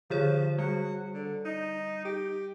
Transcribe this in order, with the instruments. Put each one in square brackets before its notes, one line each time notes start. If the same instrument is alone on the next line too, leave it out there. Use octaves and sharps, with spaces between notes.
[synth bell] D3 G#4 C#5 [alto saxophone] F3
[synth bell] G3 [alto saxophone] F#4
[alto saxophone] D3
D#4
G4